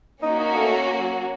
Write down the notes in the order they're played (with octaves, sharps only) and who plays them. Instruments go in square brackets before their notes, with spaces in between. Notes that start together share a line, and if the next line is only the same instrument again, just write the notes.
[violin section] A#3 C#4 F#4 [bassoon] D#4
[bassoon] D#4
A3
F#3